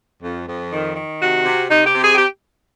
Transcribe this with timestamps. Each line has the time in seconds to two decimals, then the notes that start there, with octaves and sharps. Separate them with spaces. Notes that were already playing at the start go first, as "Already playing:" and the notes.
0.22 F2
0.47 F2
0.72 D#3
0.96 D#3
1.20 C3 F#4
1.46 C3
1.70 C3 D#4
1.86 G4
1.95 C3
2.03 G#4
2.15 G4